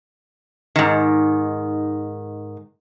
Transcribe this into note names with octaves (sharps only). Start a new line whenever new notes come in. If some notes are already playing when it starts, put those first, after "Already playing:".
G#2 D#3